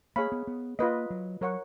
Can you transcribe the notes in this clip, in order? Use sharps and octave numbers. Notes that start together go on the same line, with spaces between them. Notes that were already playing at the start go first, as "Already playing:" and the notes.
A#3 G#4 C#5 F5 B5
B3
B3
A#3 F4 B4 D#5
F#3
F#3 A#4 C#5 F#5 C#6